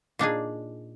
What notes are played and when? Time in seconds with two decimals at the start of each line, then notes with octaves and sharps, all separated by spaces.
0.19 A#2 D4 D#4 G#4